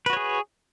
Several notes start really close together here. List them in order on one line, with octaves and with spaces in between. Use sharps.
B4 F#4 C#5 G#4